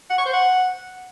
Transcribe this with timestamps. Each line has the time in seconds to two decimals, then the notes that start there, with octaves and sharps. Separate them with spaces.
0.10 F#5
0.18 C#6
0.26 C5
0.33 F#5